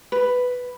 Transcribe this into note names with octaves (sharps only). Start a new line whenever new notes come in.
B4